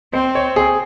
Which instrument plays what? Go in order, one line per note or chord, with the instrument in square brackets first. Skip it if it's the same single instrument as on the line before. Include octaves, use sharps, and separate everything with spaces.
[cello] C4 [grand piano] C5
[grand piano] C#5
G#4